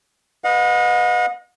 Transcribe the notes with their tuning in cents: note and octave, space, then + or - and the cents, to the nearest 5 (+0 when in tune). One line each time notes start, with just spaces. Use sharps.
B4 +0 D#5 +0 F#5 -45